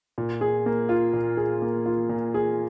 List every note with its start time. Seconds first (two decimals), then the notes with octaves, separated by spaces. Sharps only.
0.18 A#2
0.41 G#4
0.66 A#3
0.89 F4
1.13 A#2
1.37 G#4
1.62 A#3
1.86 F4
2.09 A#2
2.34 G#4